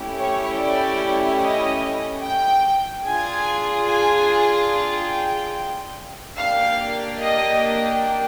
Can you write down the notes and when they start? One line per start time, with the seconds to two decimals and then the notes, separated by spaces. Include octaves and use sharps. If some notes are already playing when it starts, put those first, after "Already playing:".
Already playing: A3 C#4 E4 G4
0.17 C#5
0.58 D5
1.41 D#5
2.23 G5
3.06 D4 F4 G#4 G#5
3.89 G#5
4.71 G5
6.36 A#3 D4 G4 F5
7.19 D#5